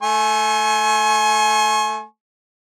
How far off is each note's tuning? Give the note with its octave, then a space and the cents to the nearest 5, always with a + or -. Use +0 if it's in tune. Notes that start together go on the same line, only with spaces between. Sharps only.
A3 +0 G#5 +30 C#6 -40